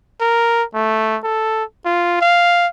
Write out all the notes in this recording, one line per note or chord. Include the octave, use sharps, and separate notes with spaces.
A#4
A3
A4
F4
F5